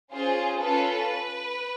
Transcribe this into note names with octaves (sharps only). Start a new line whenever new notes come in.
C#4 F4 G#4 C5
C#4 F4 A4 B4